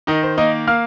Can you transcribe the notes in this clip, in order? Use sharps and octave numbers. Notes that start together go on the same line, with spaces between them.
D#3 D#4 D#5
C5
A#3 D#4 D#5
A#3 F5 F6